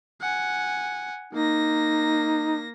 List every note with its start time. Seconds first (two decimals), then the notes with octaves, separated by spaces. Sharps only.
0.21 F#5 G#5
1.34 A#3 D#4 A#6